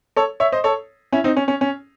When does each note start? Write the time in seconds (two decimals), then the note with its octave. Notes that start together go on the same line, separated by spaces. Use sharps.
0.16 A4 C#5
0.40 C#5 E5
0.52 C5 D#5
0.64 A4 C#5
1.12 C#4 E4
1.24 C4 D#4
1.37 C#4
1.48 C#4
1.61 C#4